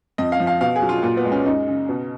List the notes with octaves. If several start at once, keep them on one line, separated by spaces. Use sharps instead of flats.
F2 D#5
F5
F3
F5
B2 F5
G#4
F#3
F4
A#2 F4
B3
G#3
C#4
F#2 D#4
C#3
B2